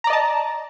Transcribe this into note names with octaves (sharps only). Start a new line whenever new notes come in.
D5 D#5 A5 A#5